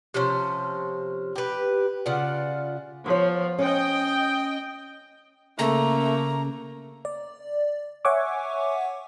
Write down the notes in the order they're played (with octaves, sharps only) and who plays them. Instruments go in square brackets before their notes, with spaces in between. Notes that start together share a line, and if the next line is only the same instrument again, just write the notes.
[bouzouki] C3 F3 C#4 C5
G4 B4
C#3 F4 D5 F#5
[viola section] F3 [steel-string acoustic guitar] B3 C#5
[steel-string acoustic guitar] C#4 [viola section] D#5 G5
[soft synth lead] C#3 [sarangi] A3 [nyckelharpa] A#3 [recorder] A#5
[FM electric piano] D5
C#5 E5 F#5 G#5 C#6 D6